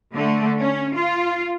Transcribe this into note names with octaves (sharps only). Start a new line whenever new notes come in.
D3 A3
C#4
F4